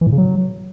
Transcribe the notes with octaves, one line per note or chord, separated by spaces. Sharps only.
E3
A2
C#3
F#3